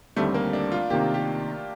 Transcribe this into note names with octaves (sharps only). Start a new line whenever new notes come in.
D#2 D3 G3 A3 C4
A#3
D4
F4
C3 D#3 A#3 G4
G4